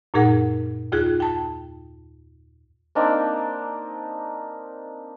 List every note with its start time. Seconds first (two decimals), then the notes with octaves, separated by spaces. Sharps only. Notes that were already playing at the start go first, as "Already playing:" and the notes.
0.14 F#2 A#2 D#4 G#4 A#4 F#5
0.92 D#2 F4 G#4 F#6
1.20 G5 A5
2.95 A#3 C4 D4 D#4